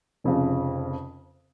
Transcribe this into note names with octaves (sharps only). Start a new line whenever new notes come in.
F1 F2 C#3 F3